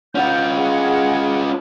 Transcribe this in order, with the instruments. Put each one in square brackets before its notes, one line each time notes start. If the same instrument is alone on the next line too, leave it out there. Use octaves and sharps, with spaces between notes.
[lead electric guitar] C#4 F4 [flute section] F#5 G6
[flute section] G#4 F#5